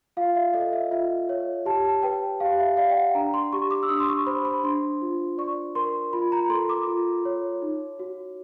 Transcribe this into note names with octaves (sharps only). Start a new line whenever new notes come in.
F4 F5
E5
A4 D#5
E5
F4 E5
C#5
G4 A5
A5
B4 G5
G4 F5
E5
D5 F5
G5
F#5
D4 A#5
C6
G4 C#6
D6
E6
D4 D#6
C6
C#6
C5 B5
B5
D4 C6
F4
D5 C#6
A#4 C6
F4 B5
A#5
A4 C6
D6
F4
C#5
D#4
F#4